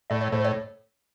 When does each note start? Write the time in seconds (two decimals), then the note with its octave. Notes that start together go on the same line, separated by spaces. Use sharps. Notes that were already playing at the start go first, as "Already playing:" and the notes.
0.10 A2 D5
0.21 C#5
0.32 A2 C5
0.44 C#5